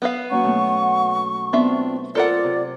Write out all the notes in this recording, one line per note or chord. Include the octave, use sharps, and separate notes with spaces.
B3 B4 F5
F#3 A#3 C#4 F#5 C#6
B2 A3
B3 C4 D4 F4 E5
F4 A4 A#4 C5 D5 F#5
C3